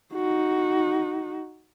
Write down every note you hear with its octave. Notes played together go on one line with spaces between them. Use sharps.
D#4 F#4